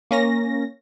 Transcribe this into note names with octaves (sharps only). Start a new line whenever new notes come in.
A#3 C#4 A#6